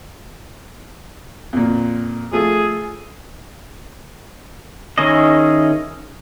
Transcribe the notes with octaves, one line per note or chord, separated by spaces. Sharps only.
F2 A#2
F3 A3 F4 G#4
D#3 C#4 E4 G#4 D#5